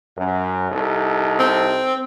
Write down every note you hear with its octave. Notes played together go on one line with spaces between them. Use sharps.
F#2
C2 D#4 A4
C4